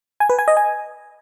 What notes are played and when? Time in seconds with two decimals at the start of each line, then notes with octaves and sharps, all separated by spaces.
0.20 G#5
0.29 B4
0.39 G#5
0.48 D#5
0.57 G#5